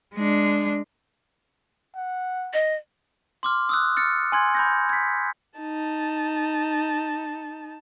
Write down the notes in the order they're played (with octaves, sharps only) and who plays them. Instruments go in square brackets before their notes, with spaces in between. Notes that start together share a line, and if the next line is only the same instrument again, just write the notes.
[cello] G#3 D4
[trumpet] F#5
[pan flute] D#5
[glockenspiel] C6 D6 F6
D#6 E6 F#6
F6 A6 C#7
G#5 C6 G#6
B5 G6 A#6
G#6 B6
[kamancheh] D#4 A5